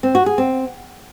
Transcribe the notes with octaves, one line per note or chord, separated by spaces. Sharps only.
C4
F#4
G#4
C4